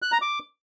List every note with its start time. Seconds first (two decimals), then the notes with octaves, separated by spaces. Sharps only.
0.02 F#6
0.12 A#5
0.22 D6